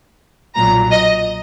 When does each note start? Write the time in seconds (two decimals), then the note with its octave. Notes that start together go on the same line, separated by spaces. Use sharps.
0.56 B1 A#2 F#3 A#5
0.92 D#5